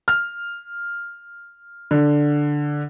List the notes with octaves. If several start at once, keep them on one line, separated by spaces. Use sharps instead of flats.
F6
D3